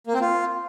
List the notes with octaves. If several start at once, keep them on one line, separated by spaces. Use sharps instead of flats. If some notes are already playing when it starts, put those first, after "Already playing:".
A#3
C4
F4